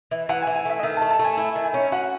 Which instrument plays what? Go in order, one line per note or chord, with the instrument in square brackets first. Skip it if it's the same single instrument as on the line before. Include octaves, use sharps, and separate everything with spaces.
[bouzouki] E3
[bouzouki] E3 [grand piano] F#5
[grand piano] G#5
[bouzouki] E3
[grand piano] G#5
[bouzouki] A3 [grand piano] E5
[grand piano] D#5
[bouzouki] D#3 [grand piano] E5
[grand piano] A5
[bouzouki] A3
[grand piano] A5
[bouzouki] A3
[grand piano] G#5
[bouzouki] E4 [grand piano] G#5
[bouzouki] D#3
[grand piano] G#5
[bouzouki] C#4
[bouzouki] F#4 [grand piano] F#5